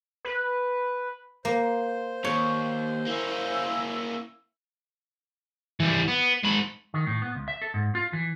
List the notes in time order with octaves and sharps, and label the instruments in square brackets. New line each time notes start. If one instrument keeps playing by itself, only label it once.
[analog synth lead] B4
[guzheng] A#3 [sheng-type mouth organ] C5
[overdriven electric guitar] D#2 [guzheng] C#5
[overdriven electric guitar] A#3 C#4 [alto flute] E4
[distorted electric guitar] E3 G3
B3
G#2 B5
[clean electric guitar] D#3
A2
B3
C#2
E5
A4
G#2
F4
E3